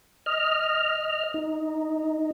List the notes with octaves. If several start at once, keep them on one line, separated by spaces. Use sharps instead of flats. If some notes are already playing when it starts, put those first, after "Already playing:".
D#5 F6
D#4